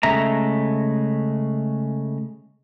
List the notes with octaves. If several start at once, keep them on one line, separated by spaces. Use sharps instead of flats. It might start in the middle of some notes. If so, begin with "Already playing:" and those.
C#3 G#3 A3 E5 A#5